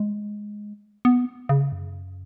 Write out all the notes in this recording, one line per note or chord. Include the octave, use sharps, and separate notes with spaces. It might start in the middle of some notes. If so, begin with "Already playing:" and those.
Already playing: G#3
B3
C#3
F#2